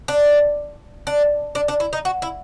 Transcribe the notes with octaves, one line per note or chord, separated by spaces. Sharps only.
D4
D4
D4
D4
E4
D#4
F#4
E4